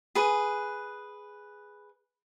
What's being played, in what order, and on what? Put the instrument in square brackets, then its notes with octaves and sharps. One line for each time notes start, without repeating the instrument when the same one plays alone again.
[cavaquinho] G#4 B4